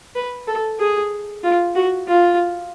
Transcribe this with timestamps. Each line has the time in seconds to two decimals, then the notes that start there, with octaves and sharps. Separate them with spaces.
0.15 B4
0.47 A4
0.79 G#4
1.43 F4
1.75 F#4
2.07 F4